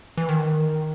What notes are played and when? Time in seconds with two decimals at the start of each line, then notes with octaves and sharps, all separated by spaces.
0.17 E3
0.29 D#3